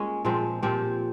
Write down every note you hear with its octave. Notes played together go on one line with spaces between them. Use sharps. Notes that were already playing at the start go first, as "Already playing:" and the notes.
Already playing: G#3 A#3 C#4 F4 G#4
A#2 F3 G#3 C4
A#2 F3 C4 G4